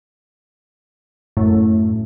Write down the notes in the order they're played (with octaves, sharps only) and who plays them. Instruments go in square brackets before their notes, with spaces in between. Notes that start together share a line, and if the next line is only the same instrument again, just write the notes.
[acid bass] F#2 [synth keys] A2